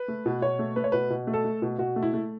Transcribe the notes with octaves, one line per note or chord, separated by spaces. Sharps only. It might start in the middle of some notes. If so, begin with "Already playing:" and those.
Already playing: B4
A3
B2
B2 C#5
A3
A3 B4
C#5
B2 B4
B2
A3
A4
A3
B2
B2 F#4
A3
E4
A3